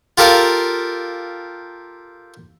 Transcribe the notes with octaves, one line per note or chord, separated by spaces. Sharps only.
F4 G4 A4 A#4 F5